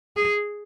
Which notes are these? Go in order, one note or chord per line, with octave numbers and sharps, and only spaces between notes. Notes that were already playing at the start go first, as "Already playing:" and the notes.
G#4